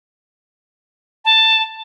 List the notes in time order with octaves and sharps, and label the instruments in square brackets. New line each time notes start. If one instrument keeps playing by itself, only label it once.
[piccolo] A5